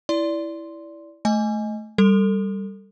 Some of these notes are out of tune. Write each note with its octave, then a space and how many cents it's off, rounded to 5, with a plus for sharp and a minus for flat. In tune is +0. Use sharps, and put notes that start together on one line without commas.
E4 +0 D5 -15 C6 +0
A3 -15 D#5 +5 G#5 +0
G3 +0 A4 +25